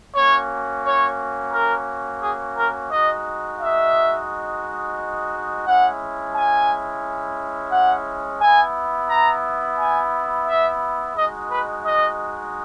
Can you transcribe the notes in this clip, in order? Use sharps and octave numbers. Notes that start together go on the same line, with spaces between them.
A#3 C#4 F#4 C#5
C#5
A#4
G#4
A#4
G#3 D#4 F#4 D#5
E5
G#3 C#4 E4 F#5
G#5
F#5
B3 E4 G#5
A#5
G#5
E5
G#3 D#4 F#4 D#5
B4
D#5